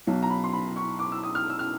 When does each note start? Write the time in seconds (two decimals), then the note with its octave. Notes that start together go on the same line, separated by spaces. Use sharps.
0.07 B1 B2 F#3
0.23 A#5
0.30 B5
0.44 C6
0.53 B5
0.76 C#6
0.99 D6
1.12 E6
1.23 D#6
1.35 F6
1.50 E6
1.59 F6